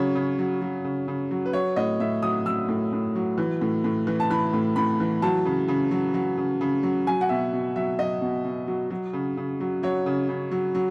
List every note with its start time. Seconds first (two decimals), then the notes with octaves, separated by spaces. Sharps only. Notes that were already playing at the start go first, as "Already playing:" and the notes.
Already playing: C#3 F#3 C#5
0.15 C#3
0.39 F#3
0.62 F#3
0.84 C#3
1.08 C#3
1.31 F#3
1.45 B4
1.53 F#3 C#5
1.76 A2 D#5
2.00 A2 E5
2.22 F#3 D#6
2.46 F#3 E6
2.69 A2
2.93 A2
3.15 F#3
3.38 E3
3.61 A2
3.84 A2
4.07 E3
4.20 A5
4.30 E3 B5
4.53 A2
4.76 A2 B5
5.00 E3
5.22 F#3 A5
5.45 C#3
5.68 C#3
5.91 F#3
6.14 F#3
6.37 C#3
6.61 C#3
6.83 F#3
7.07 F#3 G#5
7.21 F#5
7.29 B2 E5
7.53 B2
7.76 F#3 E5
7.99 F#3 D#5
8.21 B2
8.44 B2
8.67 F#3
8.90 F#3
9.13 C#3
9.37 C#3
9.60 F#3
9.83 F#3 C#5
10.06 C#3
10.29 C#3
10.51 F#3
10.75 F#3